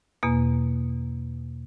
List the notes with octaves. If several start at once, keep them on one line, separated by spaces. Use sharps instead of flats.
E2 B2 A#3